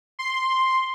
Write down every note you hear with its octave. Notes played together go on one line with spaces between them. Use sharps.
C6